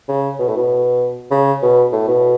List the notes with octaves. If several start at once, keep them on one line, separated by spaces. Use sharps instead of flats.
C#3
B2
A2
B2
C#3
B2
A2
B2